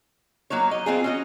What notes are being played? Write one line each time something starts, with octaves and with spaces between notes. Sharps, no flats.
F#3 A#3 D#4 C#5
D#5
E3 C4 F4 G#4
C#4 F#4 D#5